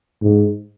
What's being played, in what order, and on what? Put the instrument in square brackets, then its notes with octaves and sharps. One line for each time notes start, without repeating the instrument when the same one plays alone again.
[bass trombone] G#2